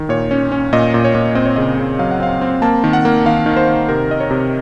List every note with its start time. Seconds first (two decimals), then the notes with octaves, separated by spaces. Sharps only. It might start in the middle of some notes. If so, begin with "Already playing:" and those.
Already playing: D#3
0.09 A#2 C#5
0.31 C#4
0.52 C#4
0.73 A#2 D#5
0.94 A#2
1.05 C#5
1.15 A#2
1.35 C4 D#5
1.45 C#5
1.56 C#3 D#5
1.78 C#3
1.99 F#3 F5
2.11 F#5
2.20 C4 F5
2.41 C4
2.62 A#3 A5
2.84 D#3
2.93 F#5
3.05 A#3
3.26 D#3 F5
3.46 D#3
3.57 C5
3.68 D#3
3.89 C3 A#4
4.10 C4 D#5
4.20 C#5
4.31 C3